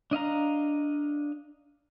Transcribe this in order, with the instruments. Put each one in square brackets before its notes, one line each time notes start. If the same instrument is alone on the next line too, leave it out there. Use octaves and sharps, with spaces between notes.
[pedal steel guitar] D4 D#5 F5 A#5